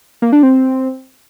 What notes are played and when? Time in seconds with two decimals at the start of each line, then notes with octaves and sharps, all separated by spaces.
0.22 A#3
0.32 D4
0.43 C4